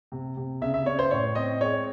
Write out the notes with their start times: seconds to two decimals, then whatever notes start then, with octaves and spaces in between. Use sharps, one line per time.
0.12 C3
0.37 C3
0.62 C#3 E5
0.74 E5
0.86 C#3 C#5
0.99 C5
1.11 A2 C#5
1.35 C4 D#5
1.61 G#3 C#5